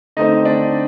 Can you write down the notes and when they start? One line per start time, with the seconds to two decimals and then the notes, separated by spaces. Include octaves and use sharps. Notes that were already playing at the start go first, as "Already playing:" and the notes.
0.17 D3 A3 C4 D#4 D#5
0.45 D4 D5